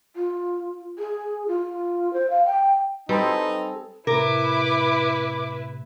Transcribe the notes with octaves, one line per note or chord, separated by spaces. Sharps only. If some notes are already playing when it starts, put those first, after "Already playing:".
F4
G#4
F4
C5
F5
G5
G3 C4 D#4 G#4 A4 B4 B5 C6
A2 C3 E4 A#4 B4 D6